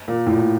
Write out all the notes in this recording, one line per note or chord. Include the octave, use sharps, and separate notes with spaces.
A#2
A2
A#2